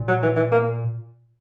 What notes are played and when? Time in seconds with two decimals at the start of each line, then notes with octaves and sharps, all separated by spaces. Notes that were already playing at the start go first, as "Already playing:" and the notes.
Already playing: A#2
0.08 F#3
0.23 E3
0.36 E3
0.52 A#3